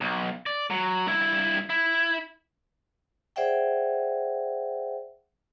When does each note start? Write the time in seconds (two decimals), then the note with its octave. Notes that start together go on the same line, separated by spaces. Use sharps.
0.01 B1
0.46 D5
0.71 F#3
1.06 G2 E4
1.70 E4
3.36 G#4 C5 D5 E5 F#5 G5